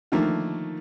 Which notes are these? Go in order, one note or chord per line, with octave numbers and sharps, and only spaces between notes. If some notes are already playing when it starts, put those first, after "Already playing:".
D3 D#3 F3 A3 A#3